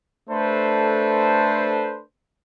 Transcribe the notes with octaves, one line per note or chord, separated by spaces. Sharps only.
A3 D4 A4 B4 C5